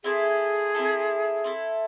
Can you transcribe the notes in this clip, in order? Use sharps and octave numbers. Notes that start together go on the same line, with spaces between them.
C4 E4 G#4 A4
C4 E4 A4
C4 E4 A4